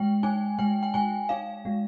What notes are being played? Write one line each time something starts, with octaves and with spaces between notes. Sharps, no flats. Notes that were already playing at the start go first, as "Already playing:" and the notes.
Already playing: G#3 G5
D#4 G#5
G#3 G5
G5
G#3 G#5
D#4 F5
G#3